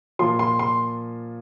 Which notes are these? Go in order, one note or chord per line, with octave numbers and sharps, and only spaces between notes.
A#2 F3 C6
C6
C6